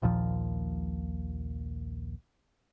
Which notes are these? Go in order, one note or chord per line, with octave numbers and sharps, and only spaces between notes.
A#1 D#2 A#2 F3